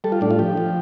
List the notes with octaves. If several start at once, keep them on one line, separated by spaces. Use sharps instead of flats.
G3 A4
F4
A2 D4
F4
F3 G4
F3